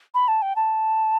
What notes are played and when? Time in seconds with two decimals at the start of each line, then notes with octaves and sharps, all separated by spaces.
0.15 B5
0.28 A5
0.42 G5
0.56 A5